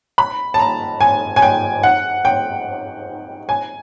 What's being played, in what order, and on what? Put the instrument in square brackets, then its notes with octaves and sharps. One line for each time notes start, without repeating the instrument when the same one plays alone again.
[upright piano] B5
A5
A#5
G#5
G#5
G5
F#5
G5
G#5